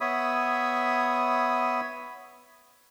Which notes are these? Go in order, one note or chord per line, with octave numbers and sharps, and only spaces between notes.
B3 C#5 E5 B5 D#6